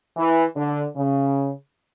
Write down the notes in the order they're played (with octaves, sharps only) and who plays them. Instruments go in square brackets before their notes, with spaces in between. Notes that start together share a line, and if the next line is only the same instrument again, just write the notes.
[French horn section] E3
D3
C#3